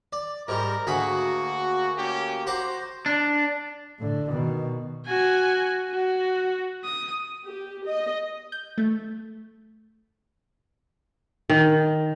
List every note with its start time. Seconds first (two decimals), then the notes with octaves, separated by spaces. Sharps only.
0.13 D5
0.48 G#2 G3 A#4
0.87 D2 A#3 F#4 G#4 B5
1.97 A#3 C#4 G4
2.47 F#4 C5 A#5 D6
3.06 D4
3.99 A2 D3
4.30 B2 D#3
5.06 F#4 G#5
5.91 F#4
6.84 D#6
7.45 G4
7.85 D#5
8.52 G6
8.78 A3
11.50 D#3